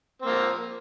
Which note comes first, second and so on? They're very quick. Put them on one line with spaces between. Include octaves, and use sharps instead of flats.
C4 A#3 F3